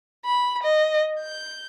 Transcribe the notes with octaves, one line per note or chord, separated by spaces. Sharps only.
B5
D#5
G6